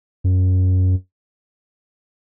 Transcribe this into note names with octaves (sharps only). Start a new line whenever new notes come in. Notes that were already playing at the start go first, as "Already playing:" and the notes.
F#2